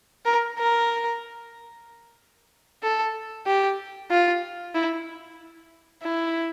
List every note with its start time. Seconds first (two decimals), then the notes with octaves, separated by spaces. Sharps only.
0.26 A#4
0.58 A#4
2.83 A4
3.46 G4
4.10 F4
4.74 E4
6.03 E4